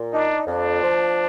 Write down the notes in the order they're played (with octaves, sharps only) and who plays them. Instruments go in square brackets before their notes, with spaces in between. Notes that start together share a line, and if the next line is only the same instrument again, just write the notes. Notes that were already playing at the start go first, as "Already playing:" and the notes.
Already playing: [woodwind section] A#2
[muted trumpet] D4 [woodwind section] D#4
[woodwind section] F2 [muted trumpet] D4
[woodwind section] F3